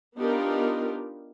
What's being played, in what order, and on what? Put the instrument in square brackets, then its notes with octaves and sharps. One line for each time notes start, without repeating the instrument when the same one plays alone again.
[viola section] B3 D4 D#4 F4 G4 A#4